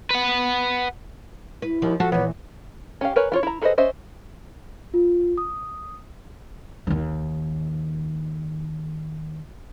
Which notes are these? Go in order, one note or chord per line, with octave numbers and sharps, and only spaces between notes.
B4 F#5
E4 B4
D#2 F3
F3 F#4 A4
A#2 E3 B3 C#5
C#4 G4 F5
A#4 B4 C#5 G#5
B3 F4 C#5
E4 A#5
G#4 A4 B4 C5 D#5
C#4 C5 D#5 E5
F4
D#6
D#2 D#3